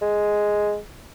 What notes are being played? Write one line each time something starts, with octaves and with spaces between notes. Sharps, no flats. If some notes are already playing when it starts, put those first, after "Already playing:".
G#3